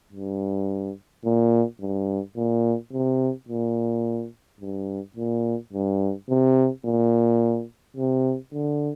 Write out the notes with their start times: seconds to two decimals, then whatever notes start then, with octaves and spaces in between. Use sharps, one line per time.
0.13 G2
1.25 A#2
1.81 G2
2.37 A#2
2.92 C3
3.48 A#2
4.61 G2
5.16 A#2
5.73 G2
6.29 C3
6.85 A#2
7.97 C3
8.53 D3